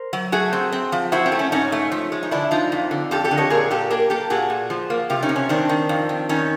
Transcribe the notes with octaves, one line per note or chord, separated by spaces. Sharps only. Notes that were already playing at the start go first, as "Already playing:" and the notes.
Already playing: A#4 C5
F#3
A3 F#4 G#4
C4
C4
F3
C4 E4 F#4
C4
A3
C#4
G#2 C#4 D#4
A3
F3
G#3
D#4
D3 D4 E4
F3 D#4 F4
F2
D3
F2 G4 A4
G4 A4
D3
C#5 D#5
A#2 G#4 A#4
A#2 G4 A4
A#3 G#4 A#4
A#3 G4 A4
A#2 F#4 G#4
A#2
F3
A#3
C3 F4 G4
C#4 D#4
C3
C#4
D#3 C4 D4
D#3
F2
D#3
D#3 C#4 D#4